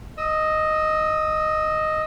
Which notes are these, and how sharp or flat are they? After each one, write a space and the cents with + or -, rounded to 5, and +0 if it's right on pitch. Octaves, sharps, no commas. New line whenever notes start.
D#5 +0 E6 -30